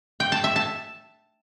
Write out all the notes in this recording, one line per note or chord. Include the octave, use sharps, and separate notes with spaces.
G5
A5
E5
A5